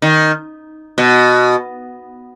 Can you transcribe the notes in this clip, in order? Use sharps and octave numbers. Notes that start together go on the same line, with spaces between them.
D#3
B2